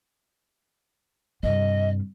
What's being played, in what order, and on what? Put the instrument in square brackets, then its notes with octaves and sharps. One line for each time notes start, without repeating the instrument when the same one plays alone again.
[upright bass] G2 C3 [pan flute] D#5